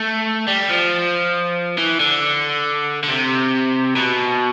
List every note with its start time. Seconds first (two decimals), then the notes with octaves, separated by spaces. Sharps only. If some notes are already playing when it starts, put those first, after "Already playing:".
Already playing: A3
0.48 G3
0.69 F3
1.78 E3
2.00 D3
3.03 D3
3.08 C3
3.96 B2